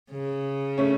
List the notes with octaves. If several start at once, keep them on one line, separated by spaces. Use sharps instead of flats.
C#3
A3 C#4